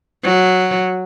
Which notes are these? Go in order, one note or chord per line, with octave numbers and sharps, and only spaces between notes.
F#3